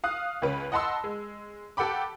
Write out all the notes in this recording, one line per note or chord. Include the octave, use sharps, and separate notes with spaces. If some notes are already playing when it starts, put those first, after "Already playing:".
F5 D#6 F#6
C#2 C#4 B4
D#5 F#5 A5 B5 C6 E6
G#3
G4 A4 F#5 G5 B5 D6